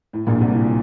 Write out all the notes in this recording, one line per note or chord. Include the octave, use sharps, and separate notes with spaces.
A2
A#1 A#2
C2 C3